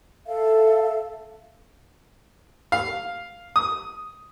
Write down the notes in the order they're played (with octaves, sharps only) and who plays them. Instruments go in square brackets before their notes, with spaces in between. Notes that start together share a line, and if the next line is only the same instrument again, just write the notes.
[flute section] A4 E5 F5
[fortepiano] F5
D#6